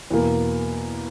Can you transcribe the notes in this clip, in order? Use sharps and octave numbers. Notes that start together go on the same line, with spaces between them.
E2 B2 A#3